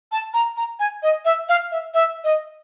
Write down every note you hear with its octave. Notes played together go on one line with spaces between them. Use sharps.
A5
A#5
A#5
G#5
D#5
E5
F5
E5
E5
D#5